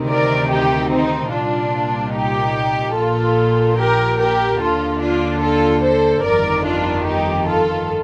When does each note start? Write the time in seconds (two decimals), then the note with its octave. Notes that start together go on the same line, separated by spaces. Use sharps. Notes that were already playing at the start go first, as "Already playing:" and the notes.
Already playing: D2 C3 D#3
0.08 A#4 D5
0.49 D#4 G4
0.90 C4 D#4
1.31 C2 A#2 D4 F4
2.14 D#4 G4
2.96 A#1 A#2 F4 A4
3.78 G4 A#4
4.19 G4 A#4
4.60 D#2 D3 F4 A4
5.00 D4 F4
5.42 F4 A4
5.83 A4 C5
6.24 G1 F2 D#3 A#4 D5
6.66 D4 F4
7.06 D#4 G4
7.47 F4 A4